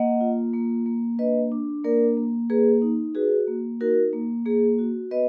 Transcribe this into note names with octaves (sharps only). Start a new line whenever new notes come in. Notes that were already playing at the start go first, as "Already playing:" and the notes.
Already playing: A#3 D#5 F#5
F4
A#3
A#3
D4 B4 D#5
D4
A#3 A#4 D5
A#3
A#3 G#4 B4
D#4
F#4 G#4 B4
A#3
D#4 F#4 A#4
A#3
A#3 G#4
F#4
B3 B4 D#5